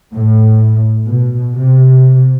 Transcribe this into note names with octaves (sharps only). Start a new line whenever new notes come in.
A2
B2
C3